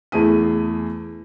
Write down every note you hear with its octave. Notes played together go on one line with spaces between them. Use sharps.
E2 A3 G#4 D#7